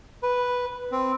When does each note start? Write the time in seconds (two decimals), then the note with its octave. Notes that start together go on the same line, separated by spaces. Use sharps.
0.23 B4
0.92 C4